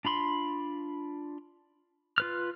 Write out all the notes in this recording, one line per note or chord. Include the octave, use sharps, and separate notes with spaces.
D4 F4 B5 C6
F4 B4 F6